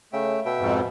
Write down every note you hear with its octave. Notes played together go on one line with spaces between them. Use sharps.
C#3 A3 E5 G5
B2 E5 G5
F2 G#2